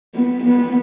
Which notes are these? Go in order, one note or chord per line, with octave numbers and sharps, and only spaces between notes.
B3
B3